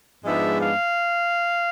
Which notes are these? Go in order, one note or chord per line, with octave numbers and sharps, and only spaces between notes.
G#2 F3 G#3 B3 D4 E5
F5